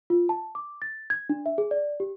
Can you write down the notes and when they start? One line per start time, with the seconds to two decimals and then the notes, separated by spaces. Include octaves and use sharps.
0.10 F4
0.29 A5
0.55 D6
0.82 A6
1.10 G#6
1.29 D4
1.46 E5
1.58 G#4
1.71 D5
2.00 G4